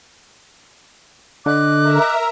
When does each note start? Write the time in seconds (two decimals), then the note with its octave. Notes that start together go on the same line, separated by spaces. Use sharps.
1.46 D3 D#5 D6 F#6
1.82 A#4 E5 A#5